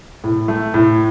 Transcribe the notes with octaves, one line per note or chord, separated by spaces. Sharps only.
A2
A3
A2